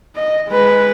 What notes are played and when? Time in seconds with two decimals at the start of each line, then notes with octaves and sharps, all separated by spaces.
0.16 D#5
0.48 G#3 B4